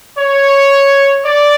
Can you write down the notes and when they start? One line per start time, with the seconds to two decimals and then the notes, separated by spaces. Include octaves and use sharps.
0.17 C#5
1.25 D5